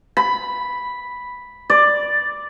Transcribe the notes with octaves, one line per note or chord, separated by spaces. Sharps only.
B5
D5